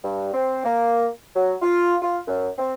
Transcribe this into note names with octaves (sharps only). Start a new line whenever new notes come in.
G2
C4
A#3
F#3
F4
F4
F#2
C4